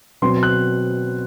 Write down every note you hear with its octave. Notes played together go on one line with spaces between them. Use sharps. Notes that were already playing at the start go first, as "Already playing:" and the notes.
B2 F#3 C4 C6
F#6